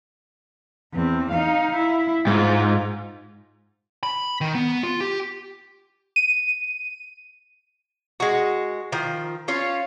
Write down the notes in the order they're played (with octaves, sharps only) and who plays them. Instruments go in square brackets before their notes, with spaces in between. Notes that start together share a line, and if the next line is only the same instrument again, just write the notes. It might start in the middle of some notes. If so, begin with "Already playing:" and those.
[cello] E2 C4
D#4 F5
E4
[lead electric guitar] G#2 [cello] F4
[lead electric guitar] B5
D#3
B3
F4
G4
[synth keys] D#7
[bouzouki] G#3 F#4
D#3 F3
C#4 F4 C#5